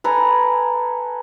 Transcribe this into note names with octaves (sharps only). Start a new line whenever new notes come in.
A4 B4 G#5 A#5